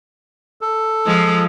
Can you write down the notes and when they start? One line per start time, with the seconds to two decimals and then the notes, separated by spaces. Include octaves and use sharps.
0.61 A4
1.05 F3 G#3 F4